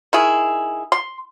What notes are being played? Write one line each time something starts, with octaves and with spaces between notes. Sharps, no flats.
D#3 E4 G#4
C6